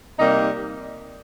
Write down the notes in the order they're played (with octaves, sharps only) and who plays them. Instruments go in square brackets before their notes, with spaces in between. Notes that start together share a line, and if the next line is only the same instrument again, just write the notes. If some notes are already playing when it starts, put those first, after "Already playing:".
[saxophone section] C3 G3 A#3 D#4